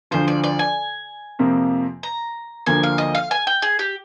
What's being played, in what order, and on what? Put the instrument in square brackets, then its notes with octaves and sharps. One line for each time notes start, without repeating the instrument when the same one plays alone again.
[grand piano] D2 D3 F3 [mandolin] C5
[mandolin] D5
D5
G#5
[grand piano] F2 C3 F3 A#3
[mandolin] A#5
[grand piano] D2 D3 F3 A#3 [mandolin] G#5
[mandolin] F5
D#5
F5
G#5
G5
G#4
G4